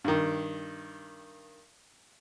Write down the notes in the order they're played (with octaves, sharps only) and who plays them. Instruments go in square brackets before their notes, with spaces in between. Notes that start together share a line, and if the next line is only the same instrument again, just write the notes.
[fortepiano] G2 D#3